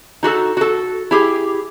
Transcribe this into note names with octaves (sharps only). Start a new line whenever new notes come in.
D#4 F#4 G4 A4
F#4 A4
E4 G4 G#4